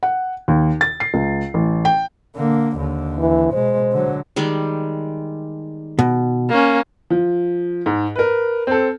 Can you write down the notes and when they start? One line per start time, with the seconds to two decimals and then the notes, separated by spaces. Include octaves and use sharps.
0.03 F#5
0.48 D#2
0.81 A6
1.00 C7
1.14 C#2
1.54 A1
1.85 G5
2.36 D3 A#3
2.77 D#2 D3
3.18 E3
3.53 B2 G#3 C5
3.92 D3 F#3
4.36 D#3 G3 G#3
5.99 B2
6.49 A#3 C#4
7.10 F3
7.86 G#2
8.16 A#4 B4
8.67 C4 A4